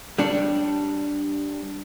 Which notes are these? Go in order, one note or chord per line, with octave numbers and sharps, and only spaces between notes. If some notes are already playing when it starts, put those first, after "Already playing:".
G3 D4 C#5